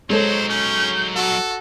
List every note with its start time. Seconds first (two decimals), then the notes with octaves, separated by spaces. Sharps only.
0.10 F#3 G#3 D#4 A4 C5 C#5
0.49 C#4 G6
1.16 F#4 A4